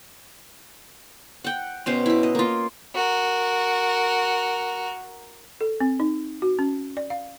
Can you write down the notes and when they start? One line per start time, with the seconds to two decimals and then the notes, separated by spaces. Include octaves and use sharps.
1.44 F#5 G5
1.86 B2 C#4 C5
2.06 E4 B5
2.23 D#5
2.35 A#3 F4
2.95 F#4 A#4
5.61 A4
5.80 C4
6.00 D#4
6.42 F#4
6.59 C#4
6.97 D5
7.10 F5